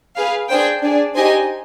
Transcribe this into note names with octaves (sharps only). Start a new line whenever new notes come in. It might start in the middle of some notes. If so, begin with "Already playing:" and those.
G#4 B4 F5
D4 G#4 C5 G5
D4 G#4 D5
D#4 G4 C5 D#5 G#5